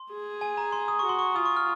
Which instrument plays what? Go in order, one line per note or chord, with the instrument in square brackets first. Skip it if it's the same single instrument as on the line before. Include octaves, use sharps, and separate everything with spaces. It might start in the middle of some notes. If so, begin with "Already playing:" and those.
Already playing: [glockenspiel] C6
[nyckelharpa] G#4
[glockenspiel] G#5
A#5
C6
D#6
C#6
[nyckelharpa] F#4 [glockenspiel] C6
[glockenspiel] C#6
[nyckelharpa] F4 [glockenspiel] D#6
[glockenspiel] C#6
F6